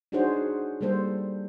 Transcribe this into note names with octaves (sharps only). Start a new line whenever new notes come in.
D4 D#4 F#4 G#4 C5 C#5
G3 A#3 A4 C5